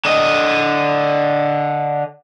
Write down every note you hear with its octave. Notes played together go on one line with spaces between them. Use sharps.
D3 D#5